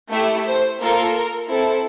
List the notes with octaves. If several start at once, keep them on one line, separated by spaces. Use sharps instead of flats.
A3 E4 G4 E5
C5
A#3 F4 A4 A#4
C4 E4 A4